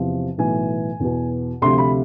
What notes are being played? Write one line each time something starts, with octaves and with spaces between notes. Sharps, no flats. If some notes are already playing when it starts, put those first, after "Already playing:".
Already playing: E2 C3 F3
B1 A2 E3 G#5
E2 B2
D2 C3 F3 C6
B5